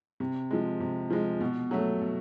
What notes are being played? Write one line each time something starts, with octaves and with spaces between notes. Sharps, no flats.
C3
F3 G#3
C3
F3 G#3
B2
F#3 A3
B2